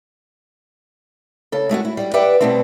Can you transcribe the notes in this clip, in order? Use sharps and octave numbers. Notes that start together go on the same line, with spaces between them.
C#3 A4
G#3 A3 D#4 F#4
E4
G3 G4
G4 B4 D5 E5 F#5 G5
B2 F#3 G3 A3 B3 C4